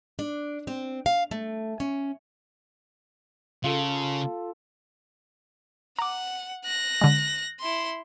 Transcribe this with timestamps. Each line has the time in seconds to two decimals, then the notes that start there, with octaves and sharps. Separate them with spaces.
0.19 D4
0.67 C4
1.06 F5
1.31 A3
1.80 C#4
3.64 C#3 F4 A4
5.99 F#5 A#5 D6
6.65 F#6 A#6
7.01 D3 G#3
7.60 E4 C6